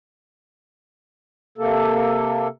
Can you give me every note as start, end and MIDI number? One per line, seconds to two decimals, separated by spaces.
1.58 2.48 48
1.58 2.48 58
1.58 2.48 69